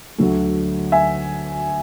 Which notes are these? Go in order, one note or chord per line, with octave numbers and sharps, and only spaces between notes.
D2 D3 F#3 A3
E5 G#5